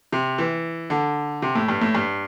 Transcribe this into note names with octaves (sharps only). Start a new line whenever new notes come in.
C3
E3
D3
C3
A2
G2
A2
G2